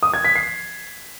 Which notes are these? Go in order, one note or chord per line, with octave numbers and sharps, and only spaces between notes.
D#6
G#6
B6
C7